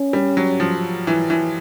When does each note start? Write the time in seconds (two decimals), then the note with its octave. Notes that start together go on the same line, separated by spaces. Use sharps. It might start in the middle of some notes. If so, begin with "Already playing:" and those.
Already playing: C#4
0.13 G3
0.37 F#3
0.60 F3
1.07 E3
1.30 E3